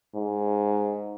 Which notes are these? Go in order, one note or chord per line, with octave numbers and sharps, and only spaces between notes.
G#2